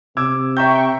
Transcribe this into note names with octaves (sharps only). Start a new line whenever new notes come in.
C3 D6 E6 G#6
E5 G5 A#5 C#6 G6